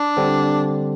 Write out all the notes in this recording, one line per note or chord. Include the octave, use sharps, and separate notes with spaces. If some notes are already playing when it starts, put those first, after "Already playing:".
Already playing: D4
D3 G3 C4